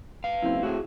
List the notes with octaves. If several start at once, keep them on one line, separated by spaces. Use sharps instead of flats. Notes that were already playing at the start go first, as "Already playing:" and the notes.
B4 F5
F#1 C4 E4
A2 F#4 G#4